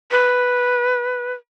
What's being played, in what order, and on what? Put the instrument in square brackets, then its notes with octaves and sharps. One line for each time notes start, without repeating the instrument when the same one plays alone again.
[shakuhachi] B4